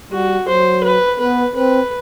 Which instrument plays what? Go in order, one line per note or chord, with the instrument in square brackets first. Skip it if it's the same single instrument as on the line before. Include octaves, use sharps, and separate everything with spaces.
[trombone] G3 [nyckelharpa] F#4
[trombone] F#3 [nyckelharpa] C5
[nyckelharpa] B4
[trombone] B3 [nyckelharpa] B4
[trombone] C4 [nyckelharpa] B4